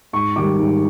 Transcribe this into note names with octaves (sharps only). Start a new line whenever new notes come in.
G#2 C#6
D#3 G3 D6
G#2